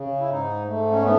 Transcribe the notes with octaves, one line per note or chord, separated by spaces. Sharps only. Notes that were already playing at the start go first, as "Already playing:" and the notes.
Already playing: C#3
E4
G#2 D#4
G#2 A3
C#4
A3 B3